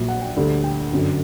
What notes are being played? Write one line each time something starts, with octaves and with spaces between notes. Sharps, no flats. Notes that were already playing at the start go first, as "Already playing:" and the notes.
Already playing: A#1 A#2 F#3
F#5
G5
D2 D3 G3
G5
G1 F#2 D3 F#3